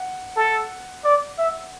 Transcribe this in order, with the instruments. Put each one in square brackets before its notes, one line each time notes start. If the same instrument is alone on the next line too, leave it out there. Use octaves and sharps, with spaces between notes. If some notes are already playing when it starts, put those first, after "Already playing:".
Already playing: [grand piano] F#5
[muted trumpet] A4
D5
E5